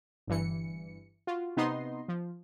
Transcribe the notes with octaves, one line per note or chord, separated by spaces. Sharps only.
G1 G2 E3 C#7
F4 F#4
C3 B3 D#4 D#5 C6
F3